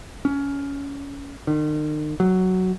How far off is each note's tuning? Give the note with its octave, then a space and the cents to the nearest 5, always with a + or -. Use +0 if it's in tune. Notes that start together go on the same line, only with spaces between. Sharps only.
C#4 +15
D#3 -40
F#3 +5